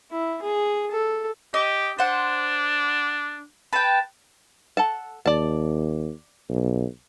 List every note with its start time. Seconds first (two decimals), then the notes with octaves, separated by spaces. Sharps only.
0.11 E4
0.42 G#4
0.91 A4
1.54 G4 D#5
1.98 D4 C5 F#5
3.73 B4 G5 A5
4.77 A4 F#5 A5
5.26 D#2 D5 A5
6.49 B1